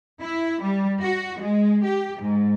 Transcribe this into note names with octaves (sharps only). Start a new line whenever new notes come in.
E4
G3
F#4
G#3
G4
G#2